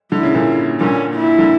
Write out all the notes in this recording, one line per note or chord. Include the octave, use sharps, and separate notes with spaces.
D3 E4
C#3
A#2 D3
A#2 D3 C#4
E4
D3